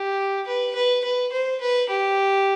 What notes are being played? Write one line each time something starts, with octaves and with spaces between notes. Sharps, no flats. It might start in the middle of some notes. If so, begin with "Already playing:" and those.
Already playing: G4
B4
B4
B4
C5
B4
G4